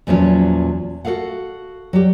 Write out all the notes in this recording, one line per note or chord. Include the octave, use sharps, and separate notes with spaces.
E2 A#2 F3 F#3 C#4
F#4 G#4 A4 F5 F#5
F#3 G3 G4